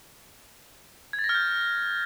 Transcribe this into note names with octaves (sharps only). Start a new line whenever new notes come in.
G#6
A6
A#6
F6
G6